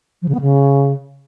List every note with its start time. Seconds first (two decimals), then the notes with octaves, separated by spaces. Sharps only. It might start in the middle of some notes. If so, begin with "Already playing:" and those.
0.22 F3
0.28 C#3
0.35 B3
0.41 C#3